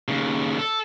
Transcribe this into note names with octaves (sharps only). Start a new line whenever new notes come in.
D#2 C#3
A4